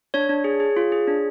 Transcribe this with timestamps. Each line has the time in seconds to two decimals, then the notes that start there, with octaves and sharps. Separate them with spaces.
0.14 D4 C#5
0.29 D4
0.44 G#4
0.60 G#4
0.76 F4
0.92 G#4
1.07 D4